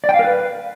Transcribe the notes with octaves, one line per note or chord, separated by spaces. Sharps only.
D5
G5
F5
A#4
B4